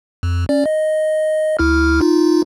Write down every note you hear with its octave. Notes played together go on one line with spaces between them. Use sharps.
F2
C#4 D5
D#5
D2 E4 F6
D#4 F4